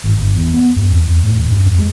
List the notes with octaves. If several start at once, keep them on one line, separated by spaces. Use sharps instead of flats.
G#1
G1
E2
B3
F#2
E2
E2
A2
D#1
F#2
F2
G#3